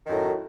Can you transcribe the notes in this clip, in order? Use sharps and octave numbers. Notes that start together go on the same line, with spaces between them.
F#2 A2 D#3